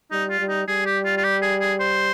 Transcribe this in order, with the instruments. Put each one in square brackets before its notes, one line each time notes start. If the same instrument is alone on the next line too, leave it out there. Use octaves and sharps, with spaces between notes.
[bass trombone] G3 [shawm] D#4
[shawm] F4
[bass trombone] G3
[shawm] D#4
[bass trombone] G3 [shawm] G#4
[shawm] G4
F4
F4
G4
G#4
G#4
C5